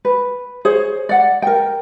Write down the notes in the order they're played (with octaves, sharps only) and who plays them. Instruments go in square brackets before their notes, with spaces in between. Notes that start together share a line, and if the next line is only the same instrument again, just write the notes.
[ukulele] B4
G#4 C5 C#5
D5 F#5
A#4 G5